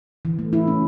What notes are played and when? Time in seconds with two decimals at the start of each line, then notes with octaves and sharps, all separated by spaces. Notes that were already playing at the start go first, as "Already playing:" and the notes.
0.25 E3
0.39 A3
0.53 E4
0.67 C#4